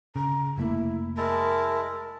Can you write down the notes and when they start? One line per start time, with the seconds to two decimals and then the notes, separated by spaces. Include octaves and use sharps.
0.16 C#3 A#5
0.58 F1 A3 A#3 E4
1.17 G#3 E4 A#4 A5